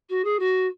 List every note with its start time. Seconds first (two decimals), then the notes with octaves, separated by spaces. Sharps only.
0.09 F#4
0.24 G#4
0.39 F#4